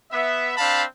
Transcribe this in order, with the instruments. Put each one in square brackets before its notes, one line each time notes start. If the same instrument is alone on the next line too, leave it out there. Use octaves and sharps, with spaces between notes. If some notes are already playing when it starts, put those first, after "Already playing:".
[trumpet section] B3 E5
C4 D4 F5 A5 B5